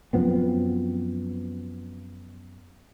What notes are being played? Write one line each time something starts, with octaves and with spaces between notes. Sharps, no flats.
F#2 F3 B3 C4